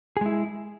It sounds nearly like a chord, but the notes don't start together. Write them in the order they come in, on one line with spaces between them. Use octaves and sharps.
G#4 G#3 E4